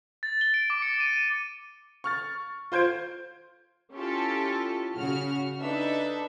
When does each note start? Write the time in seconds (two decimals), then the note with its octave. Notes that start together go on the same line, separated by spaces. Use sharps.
0.23 A6
0.41 G7
0.54 D7
0.70 D6
0.82 C#7
1.00 D#7
1.17 D#7
2.04 C#6 F6 A6
2.72 F4 C5 G6 G#6 D7
3.95 C#4 E4 F4 G4 A4
4.95 C#3 F#4 F6
5.61 D4 D#4 A4 B4 E5